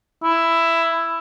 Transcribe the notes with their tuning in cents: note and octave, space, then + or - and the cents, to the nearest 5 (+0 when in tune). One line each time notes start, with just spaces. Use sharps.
E4 +10